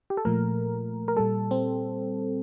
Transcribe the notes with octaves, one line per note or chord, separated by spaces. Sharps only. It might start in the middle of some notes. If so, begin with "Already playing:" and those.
G4
A4
A#2 F3 A3 A#4
A#4
A#2 G3 A4
C4